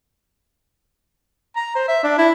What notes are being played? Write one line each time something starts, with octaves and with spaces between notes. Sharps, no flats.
A#5
C5
E5
D4
E4